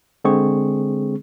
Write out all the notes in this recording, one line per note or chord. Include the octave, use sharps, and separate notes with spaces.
D3 G#3 C4 G#4 C#6